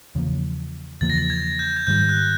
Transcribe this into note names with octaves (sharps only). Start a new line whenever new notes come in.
E2 C#3 F3 A#3
E2 C#3 F3 A#3 A6
A#6
A6
G#6
G6
G#6
G#2 D#3 G3 G6
F#6